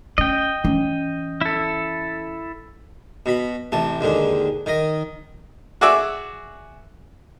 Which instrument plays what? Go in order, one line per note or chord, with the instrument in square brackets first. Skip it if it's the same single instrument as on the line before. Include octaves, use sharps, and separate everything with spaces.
[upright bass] C#4 [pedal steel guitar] D#5 G5
[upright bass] E3 C#4
[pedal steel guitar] E4 A4
[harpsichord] B2 B5
A1 C3 A5
D#2 G#2 D3
D#3 D#5
[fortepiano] F#4 G#4 D5 E5